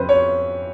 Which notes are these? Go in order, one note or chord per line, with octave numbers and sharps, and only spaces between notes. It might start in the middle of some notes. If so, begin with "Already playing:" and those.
Already playing: F2 C#3 B4 C5
C#5